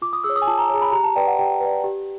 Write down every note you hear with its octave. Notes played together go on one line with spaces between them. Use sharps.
F4 D6
D#6
G#4 E6
C#5
D#6
G#5
F4 A5
A#5
G#4 C#5 A#5
B5
G4 A#5
A5
B4 D5 G5
F#5
G4 G5
B4 D5
G4